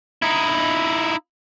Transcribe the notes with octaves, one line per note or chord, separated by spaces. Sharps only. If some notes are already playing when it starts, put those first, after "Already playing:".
D#4 E4